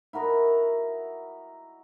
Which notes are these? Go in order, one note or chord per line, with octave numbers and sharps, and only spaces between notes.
E4 F#4 A#4 D#5